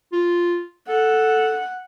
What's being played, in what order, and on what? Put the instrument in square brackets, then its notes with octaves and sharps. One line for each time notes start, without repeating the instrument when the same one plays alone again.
[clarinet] F4
[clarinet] A4 [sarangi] F#5